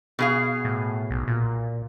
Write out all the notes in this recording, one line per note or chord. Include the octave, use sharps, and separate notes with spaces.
B2 G#4 F5
A2
B1
A#2